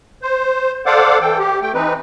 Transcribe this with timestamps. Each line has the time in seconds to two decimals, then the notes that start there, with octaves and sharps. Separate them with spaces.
0.22 C5
0.86 A4 C5 D5 F5 F#5 D6
1.21 E3 A4 G5
1.39 G4
1.62 A3 G5
1.74 E3 C4 D#4 B4